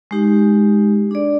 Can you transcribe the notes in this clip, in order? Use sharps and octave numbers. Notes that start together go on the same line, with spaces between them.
G#3 D#4 G4
D4 G#4 D5